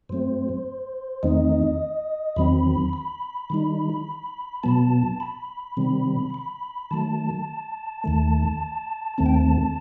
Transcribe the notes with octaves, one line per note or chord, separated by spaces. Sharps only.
G2 F#3 A3 C4 C5
E2 D#3 A3 C4 D#4 D#5
E2 D#3 F#3 C4 B5
B5
D#3 G3 D#4
B2 F#3 B3 A5
B5
C3 D#3 G3 C4
B5
D#3 F#3 A3 A5
D#2 D#3 A3
D#2 D#3 A3 C4 A5
G5
A5